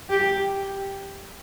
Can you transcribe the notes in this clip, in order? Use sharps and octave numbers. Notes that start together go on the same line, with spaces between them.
G4